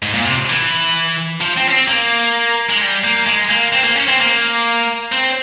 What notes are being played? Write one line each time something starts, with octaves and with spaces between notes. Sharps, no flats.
G#2
A#2
C3
E3
F3
C4
C#4
C4
A#3
G#3
G3
A#3
G#3
A#3
C4
A#3
C#4
C4
A#3
C4